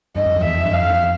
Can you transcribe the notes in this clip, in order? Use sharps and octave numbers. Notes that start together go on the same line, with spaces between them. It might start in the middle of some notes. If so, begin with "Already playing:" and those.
G2 D#5
F#2
F2
E2 E5
F2
G2
F2 F5